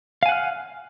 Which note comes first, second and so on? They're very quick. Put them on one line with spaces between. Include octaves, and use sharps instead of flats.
F5 G#5 F#5 F6